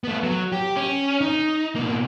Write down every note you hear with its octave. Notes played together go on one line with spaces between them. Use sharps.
A3 B3
F#3
G4
C#4
D#4
B2 A#3